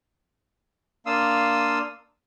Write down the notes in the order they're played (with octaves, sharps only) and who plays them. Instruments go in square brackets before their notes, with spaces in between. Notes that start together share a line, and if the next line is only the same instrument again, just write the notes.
[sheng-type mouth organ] A#3 D4 F5 C6 D#6 E6